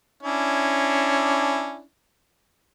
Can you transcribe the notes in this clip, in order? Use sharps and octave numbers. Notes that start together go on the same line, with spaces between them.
C#4 D4 E4